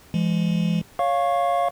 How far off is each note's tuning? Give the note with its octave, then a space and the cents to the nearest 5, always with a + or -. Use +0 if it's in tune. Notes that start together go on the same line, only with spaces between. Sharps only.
E3 +45 G#3 +0
C#5 +10 F5 +5 C#6 -15